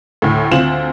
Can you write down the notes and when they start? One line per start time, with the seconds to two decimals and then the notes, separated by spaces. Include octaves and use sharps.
0.22 D2 A2
0.51 D2 C4 F4 E7 F#7